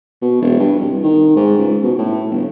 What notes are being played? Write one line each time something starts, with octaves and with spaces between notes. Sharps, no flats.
B2
E1
G2
C2
D#3
G#2
C#2
B2
A2
G1